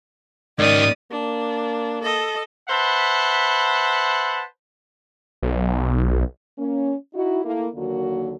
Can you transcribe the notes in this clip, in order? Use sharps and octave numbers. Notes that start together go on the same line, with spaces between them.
G#2 D#3 C#4 D5 D#6
A#3 D4
A4 D#5
B4 C5 E5 F#5 A5 B5
B1
A#3 C#4
D#4 E4 F#4
A3 A#3 E4
D#2 D3 D#3 F#3 A#3 F#4